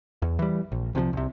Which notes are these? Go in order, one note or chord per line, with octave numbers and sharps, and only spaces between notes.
E2
E3 G3
A#1
C2 C3 E3 F3
C2 C3